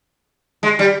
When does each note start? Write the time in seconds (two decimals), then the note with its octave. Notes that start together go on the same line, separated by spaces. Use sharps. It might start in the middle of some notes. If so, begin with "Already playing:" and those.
0.63 G#3
0.79 G3